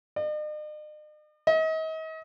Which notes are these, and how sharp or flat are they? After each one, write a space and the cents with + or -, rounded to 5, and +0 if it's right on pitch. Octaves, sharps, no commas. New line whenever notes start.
D#5 -45
D#5 +40